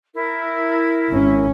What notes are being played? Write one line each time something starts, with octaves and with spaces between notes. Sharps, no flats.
E4 A#4
G#1 C#4